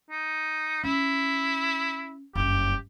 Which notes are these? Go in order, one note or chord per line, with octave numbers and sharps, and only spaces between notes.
D#4
C#4 E4
F#1 G2 G4